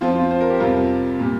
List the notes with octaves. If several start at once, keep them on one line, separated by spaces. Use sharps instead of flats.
F2 F3 C4 F4
C4 F4
C5
A#4
G4
F2 C3 G3 F4 A#4
A#2 G3